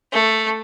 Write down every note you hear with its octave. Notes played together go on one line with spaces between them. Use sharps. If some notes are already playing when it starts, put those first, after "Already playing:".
A3